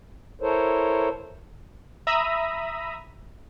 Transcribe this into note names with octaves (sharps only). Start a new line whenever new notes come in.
E4 A4 A#4 C5 C#5
E5 A#5 B5 D#6